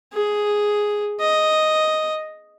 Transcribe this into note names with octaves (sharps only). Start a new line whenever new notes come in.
G#4
D#5